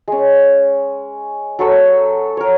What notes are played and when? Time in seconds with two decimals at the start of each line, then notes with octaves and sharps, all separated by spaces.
0.08 G#3 C#4
1.59 F#3 A4 C#6 E6
2.37 A#4 C#5